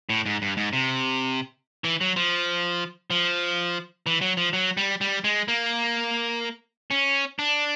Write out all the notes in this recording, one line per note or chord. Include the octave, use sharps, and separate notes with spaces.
A2
G#2
G2
G#2
C3
E3
F#3
F3
F3
E3
F#3
F3
F#3
G3
G3
G#3
A#3
C#4
D4